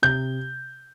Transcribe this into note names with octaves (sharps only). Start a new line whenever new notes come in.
C3 G6